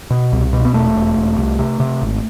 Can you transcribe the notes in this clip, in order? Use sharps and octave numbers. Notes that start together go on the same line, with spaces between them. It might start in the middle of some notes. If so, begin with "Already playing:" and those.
B2
C2
B2
B3
E1 A3
E1
E1
C2
C3
C3
G#1